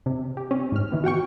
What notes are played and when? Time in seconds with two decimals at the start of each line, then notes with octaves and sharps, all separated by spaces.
0.06 C3
0.37 G4
0.51 C4 C#4
0.72 G#2 F6
0.92 D#3 E3 B3
1.04 F#4 F#5 G5 C#6